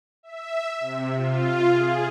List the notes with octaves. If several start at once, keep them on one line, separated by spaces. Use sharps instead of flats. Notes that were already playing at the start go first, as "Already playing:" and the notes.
E5
C3
F4
G#4